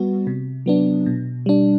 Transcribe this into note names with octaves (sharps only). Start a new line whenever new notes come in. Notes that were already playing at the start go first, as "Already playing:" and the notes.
Already playing: G3 B3 F#4
C3
F#3 B3 D4
B2
G3 D4